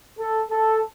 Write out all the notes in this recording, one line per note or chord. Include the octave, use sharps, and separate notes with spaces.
A4
A4